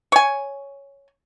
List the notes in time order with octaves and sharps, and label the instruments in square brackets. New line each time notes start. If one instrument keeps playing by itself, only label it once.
[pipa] C#5 G#5